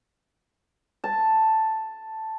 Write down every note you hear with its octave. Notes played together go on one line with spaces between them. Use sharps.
A5